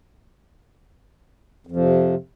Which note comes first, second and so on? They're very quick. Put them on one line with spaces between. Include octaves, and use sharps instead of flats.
F2 F3 C3